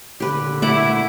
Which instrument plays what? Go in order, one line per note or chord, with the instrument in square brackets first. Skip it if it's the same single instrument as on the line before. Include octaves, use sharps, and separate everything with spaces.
[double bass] A#2 D3 [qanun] G4 B4
[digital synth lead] A3 [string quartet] E4 [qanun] F#5 A5 D6